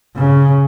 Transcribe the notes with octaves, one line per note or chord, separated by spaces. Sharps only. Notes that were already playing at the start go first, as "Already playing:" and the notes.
C#3